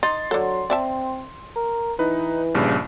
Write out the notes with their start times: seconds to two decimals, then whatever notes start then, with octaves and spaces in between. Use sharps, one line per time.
0.03 D#4 C6 A6
0.31 D3 F#3 A4
0.70 C4 D5 E5 A5
1.56 A#4
1.99 E3 D#4 B4
2.55 A#1 G2 C#3